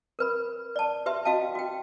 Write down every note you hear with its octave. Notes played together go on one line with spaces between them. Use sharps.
A#4 B4 B5
D5 A5
G4 B4 E5 C6
F#4 D#5 F5 G5 A5
F#4 G5